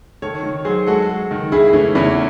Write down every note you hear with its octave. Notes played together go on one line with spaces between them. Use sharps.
D#3 A4 C#5
D#3
F#3 G#4 C5
G#3 F#4 A4
G#3
D#3
C#3 E4 G#4
E3 A3 C#4
E2 C#4 E4